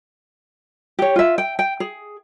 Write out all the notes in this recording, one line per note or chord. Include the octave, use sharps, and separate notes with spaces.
G4 C#5
F4 E5
G5
G5
G#4